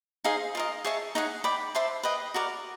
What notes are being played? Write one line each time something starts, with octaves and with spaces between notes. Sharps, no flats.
D#4 G#4 C5 F5
F4 A#4 D#5
G#4 C#5 E5 A5
D#4 G#4 C#5 F#5
D5 G5 B5
C5 E5 A5 C6
B4 D#5 G5
F#4 A#4 D5